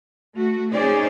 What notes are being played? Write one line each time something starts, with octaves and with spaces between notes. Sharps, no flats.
A3 F#4
C#4 D#4 G#4 C5 D5